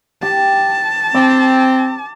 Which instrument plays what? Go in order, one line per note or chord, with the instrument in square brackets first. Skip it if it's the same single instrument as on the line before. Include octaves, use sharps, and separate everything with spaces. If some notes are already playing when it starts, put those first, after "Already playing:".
[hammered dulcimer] G4 [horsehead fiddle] A5
[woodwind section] C4 [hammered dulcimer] D6